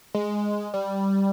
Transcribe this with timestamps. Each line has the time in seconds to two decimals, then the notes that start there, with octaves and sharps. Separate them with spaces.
0.14 G#3
0.74 G3